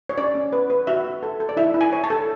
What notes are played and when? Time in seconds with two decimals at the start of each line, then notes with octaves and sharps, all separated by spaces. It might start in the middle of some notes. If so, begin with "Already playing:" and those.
0.09 C#5
0.18 C#4 D5
0.35 C#4
0.53 B4
0.70 B4
0.87 F#4 E5
1.04 F#4
1.23 A4
1.40 A4
1.49 D5
1.57 E4 E5
1.74 E4
1.81 G#5
1.93 C#5
2.04 A5
2.10 A4